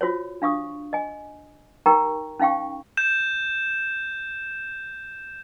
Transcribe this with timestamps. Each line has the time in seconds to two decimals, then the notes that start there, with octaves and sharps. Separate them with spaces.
0.01 F4 F#4 C5 C#5
0.42 D4 F5 C#6 D#6
0.93 D#5 G#5
1.86 D#4 G4 A#4 G5 A#5 C#6
2.39 C#4 D#4 F5 G5 C#6
2.97 G6 E7